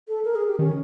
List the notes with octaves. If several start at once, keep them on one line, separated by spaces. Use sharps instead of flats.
A4
A#4
G#4
G4
D#3 C#4